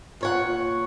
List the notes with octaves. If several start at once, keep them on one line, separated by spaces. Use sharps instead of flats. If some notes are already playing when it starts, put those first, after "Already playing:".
A#2 C#5 F#5